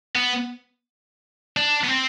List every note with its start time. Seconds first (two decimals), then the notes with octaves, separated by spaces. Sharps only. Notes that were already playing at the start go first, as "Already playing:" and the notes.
0.16 B3
1.57 D4
1.84 B3
1.88 C4